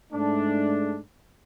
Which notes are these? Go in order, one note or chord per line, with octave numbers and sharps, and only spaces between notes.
G#2 G#3 A3 D4